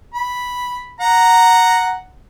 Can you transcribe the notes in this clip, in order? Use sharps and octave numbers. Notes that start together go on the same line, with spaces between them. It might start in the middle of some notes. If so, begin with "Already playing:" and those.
B5
F#5 A#5